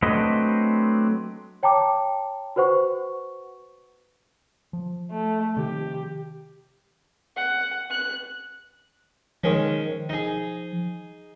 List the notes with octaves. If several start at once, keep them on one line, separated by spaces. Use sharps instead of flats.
F#3 A3 C4 D4 B4 D#5
C#5 G5 A5 A#5 D6
F#4 B4 C5 F#5 C#6
F3
A3
C3 D#3 F3 G4
F#5
F#6
D#3 F3 G#3 C#4
D#4 G#4